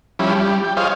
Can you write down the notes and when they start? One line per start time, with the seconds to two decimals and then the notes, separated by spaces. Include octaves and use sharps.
0.19 F3 G3 C#4 E4 B5
0.35 G3
0.64 G5
0.77 F4 G#4 C5 C#5 D#5 F5